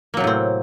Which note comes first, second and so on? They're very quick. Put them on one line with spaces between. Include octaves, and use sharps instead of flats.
A#3 F#3 C3 A2 C4